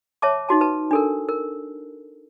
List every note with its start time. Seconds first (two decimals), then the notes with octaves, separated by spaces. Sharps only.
0.22 C#5 E5 A5 D6
0.49 D#4 F#4 A5
0.61 B4 A5
0.91 D4 A4 A#4
1.29 A#4